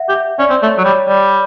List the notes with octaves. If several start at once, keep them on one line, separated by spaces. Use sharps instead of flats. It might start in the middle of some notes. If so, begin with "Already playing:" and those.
Already playing: E5 F#5
G4
E5
C#4 D5
C4
A3 C#5
F#3
G3 C#5
G3 D5